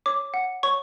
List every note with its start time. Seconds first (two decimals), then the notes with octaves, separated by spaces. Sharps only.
0.06 C#5 D6
0.34 F#5
0.63 C#5 C#6